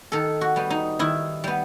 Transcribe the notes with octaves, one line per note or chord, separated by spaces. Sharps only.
D#3 A4
F#4
G3 B3
D#4
D#3 E4
G3 B3